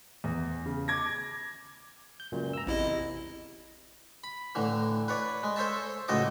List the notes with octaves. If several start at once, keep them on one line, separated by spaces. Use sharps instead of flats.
E2
C#3
D6 G#6 A#6
G6
C#2 F#2 A#2
A#5 E6
A1 E2 C3 E4 D#5
B5
A2 D3 E3
B4 C#5 D5
G#3
A4 C5 C#5 E5 A5
C#2 A2 F#3 A4 D#5 D6